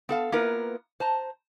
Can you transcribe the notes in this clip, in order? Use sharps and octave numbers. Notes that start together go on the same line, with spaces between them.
B3 A4 F5
A#3 B3 E4 F4 A#4 B4
C5 A5 A#5